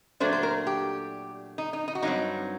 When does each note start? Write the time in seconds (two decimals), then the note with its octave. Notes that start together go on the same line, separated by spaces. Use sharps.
0.20 A#2 F#3 A3 D4 C5
0.33 C5
0.43 A#4
0.67 G4
1.58 D#4
1.73 D#4
1.88 D#4
1.95 F#4
2.03 G2 F#3 C4 D#4